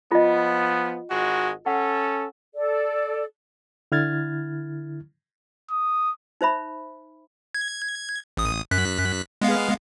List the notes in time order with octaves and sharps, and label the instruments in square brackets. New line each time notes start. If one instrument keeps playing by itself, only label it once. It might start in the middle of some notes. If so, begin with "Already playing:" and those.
[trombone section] F3 B3 [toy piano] F4 D#5
[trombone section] G#1 G#3 F#4
[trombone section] C#4 A4 [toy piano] F#5
[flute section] A4 D5
[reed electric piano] D3 E4 F6 G#6 A6
[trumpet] D#6
[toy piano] D#4 C5 E5 B5
[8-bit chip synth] G#6
A1 D#6
F#2 F#6 B6
G#3 B3 F5